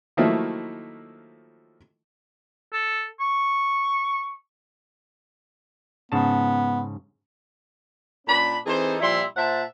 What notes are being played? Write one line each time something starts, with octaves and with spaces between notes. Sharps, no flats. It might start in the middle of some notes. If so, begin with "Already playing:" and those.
D#3 F3 F#3 A3 A#3 E4
A4
C#6
G#2 C#3 B3 A5
A#2 C#4 D4 B5
E3 C4 D#4 G#4 A4 C5
A#2 F3 G3 E4 E5 C6
A#2 C5 E5 F#5 A5